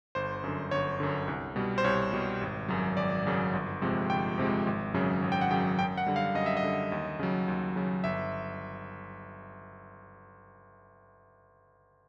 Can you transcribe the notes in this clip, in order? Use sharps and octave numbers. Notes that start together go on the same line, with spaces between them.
G1 C5
F#2 D3
G1 C#5
F#2 D3
C2
B2 G3
C5
C2 C#5
B2 G3
G#1
F#2 C#3 F#3
G#1 D5
F#2 C#3 F#3
G1
F2 C3 F3 G#3
G1 G5
F2 C3 F3 G#3
G#1
F#2 C#3 F#3
G#1
G5
F#5
F#2 C#3 F#3 G5
F#2 G5
F#5
D3 G3
F5
F#2 D#5
E5
D#5
D3 G3
D#2
C#3 F#3
D#2
C#3 F#3
G1 E5